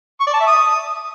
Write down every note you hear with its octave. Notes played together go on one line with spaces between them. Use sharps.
C#6
D5
A5
E5
D#6